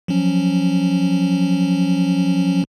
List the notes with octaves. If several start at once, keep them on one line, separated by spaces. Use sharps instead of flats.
F3 F#3 C#4